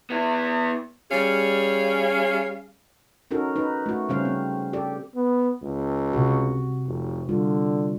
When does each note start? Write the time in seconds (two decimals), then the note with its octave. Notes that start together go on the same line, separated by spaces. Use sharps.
0.10 B3 E4
1.10 G3 C#4 G#4 F5
3.31 C#4 D#4 F#4 A4 A#4
3.56 D#4 B4
3.86 A3 F#4
4.09 C#3 G3 C#4 C5 F5
4.25 C4
4.73 G4 A4 D5
5.15 B3
5.62 C#2
6.13 C3 F#4
6.86 F1
7.29 D3 G3 F4